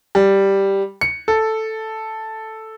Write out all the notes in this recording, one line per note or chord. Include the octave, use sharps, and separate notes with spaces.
G3
C#7
A4